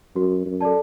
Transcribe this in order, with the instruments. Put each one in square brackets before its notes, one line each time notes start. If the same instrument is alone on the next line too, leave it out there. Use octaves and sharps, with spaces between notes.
[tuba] F#2 [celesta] F#4
[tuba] F#2
[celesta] A4 D5 A5